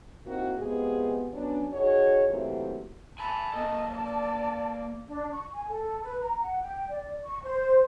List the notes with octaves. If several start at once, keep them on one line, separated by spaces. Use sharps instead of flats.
A#3 C4 D#4 E4 F#4
C3 G#3 B3 F4 G4 G#4
F#3 B3 C#4 D4
D#4 F#4 G#4 C#5
C3 E3 F#3 A3 A#3 F4
G#5 A5 B5
A#3 A4 D#5
D5
D4
C#6
G#5
A4
B4
A#5
F#5
G5
D5
C#6
C5